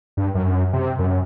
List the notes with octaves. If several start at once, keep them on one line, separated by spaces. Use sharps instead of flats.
G2
F#2
C3
F#2